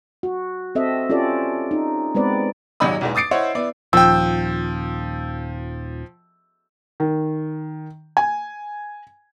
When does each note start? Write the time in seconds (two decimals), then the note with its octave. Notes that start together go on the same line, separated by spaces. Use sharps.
0.23 F#4
0.75 C4 A4 D#5 E5
1.09 C#4 F4 G4 A4 D5
1.71 D#4
2.15 G#3 B3 C4 B4 D5
2.80 D#1 G#1 F#3 D#4 B5 D#6
3.01 B1 E2 G#3
3.15 D6 D#6 A6 C7 D7
3.31 E4 C5 C#5 D#5 F#5
3.55 B3 E4 D5
3.93 D#1 F3 G5 E6
7.00 D#3
8.17 G#5